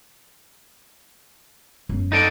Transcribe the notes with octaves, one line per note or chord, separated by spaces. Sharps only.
F#2 B3
D#4 A4 D5